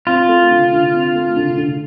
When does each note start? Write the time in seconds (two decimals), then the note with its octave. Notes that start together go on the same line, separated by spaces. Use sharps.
0.07 C4 F4
0.29 A3
0.51 D3
0.72 D3
0.93 C4
1.15 A3
1.36 D3
1.57 D3